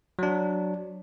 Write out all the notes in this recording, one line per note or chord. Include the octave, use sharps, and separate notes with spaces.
F#3 D4